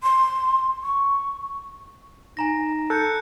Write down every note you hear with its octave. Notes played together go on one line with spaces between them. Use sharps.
C6
C#6
D#4 G#5 A#5 A#6
A4 F#6 G6 C#7